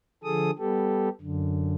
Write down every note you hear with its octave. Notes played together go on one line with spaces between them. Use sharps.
D3 F3 G#4 A4 D#6
G3 B3 G4 A4
F#2 D3